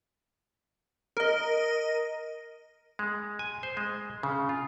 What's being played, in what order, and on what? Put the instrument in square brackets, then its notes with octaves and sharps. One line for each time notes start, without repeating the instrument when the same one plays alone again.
[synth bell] A#4 D#5
[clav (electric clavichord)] G#3
G#5
C5
G#3
C#3
F4